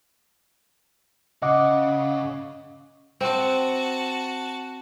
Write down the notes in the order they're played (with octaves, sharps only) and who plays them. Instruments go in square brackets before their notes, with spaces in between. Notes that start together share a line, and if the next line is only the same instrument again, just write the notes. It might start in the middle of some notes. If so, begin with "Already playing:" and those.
[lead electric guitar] C#3 [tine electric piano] D#5 F#5 D6
[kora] C4 [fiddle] F#4 A5